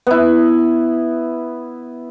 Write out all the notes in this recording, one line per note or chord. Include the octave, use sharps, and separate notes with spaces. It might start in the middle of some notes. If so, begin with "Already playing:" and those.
B3 E4